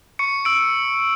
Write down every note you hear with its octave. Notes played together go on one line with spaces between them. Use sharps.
C#6 C#7
E6 D7